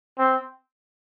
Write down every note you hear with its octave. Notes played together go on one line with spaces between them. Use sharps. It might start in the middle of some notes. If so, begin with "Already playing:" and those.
C4